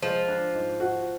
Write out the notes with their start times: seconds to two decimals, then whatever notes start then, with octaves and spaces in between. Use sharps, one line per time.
0.02 F3 G#3
0.28 D4
0.54 G#2
0.80 F#4